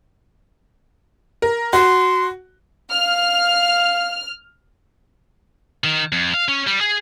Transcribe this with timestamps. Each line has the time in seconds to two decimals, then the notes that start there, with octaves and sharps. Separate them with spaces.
1.42 A#4
1.73 F#4 C6
2.91 F5 F6
5.84 D#3
6.12 F2
6.34 F5
6.49 C#4
6.67 G3
6.81 G#4